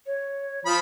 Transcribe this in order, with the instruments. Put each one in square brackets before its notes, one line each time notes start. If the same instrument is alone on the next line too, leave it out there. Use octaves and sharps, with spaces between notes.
[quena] C#5
[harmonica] F3 B5 [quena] D#6